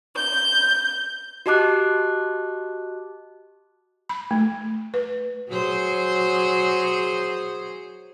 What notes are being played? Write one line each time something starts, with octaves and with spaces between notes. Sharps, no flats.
G6
F#4 G4 D#5 A5 D6 F#6
B5
A3
B4
F#3 G#4 C5